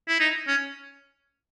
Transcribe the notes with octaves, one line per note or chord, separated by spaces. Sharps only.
E4
D#4
C#4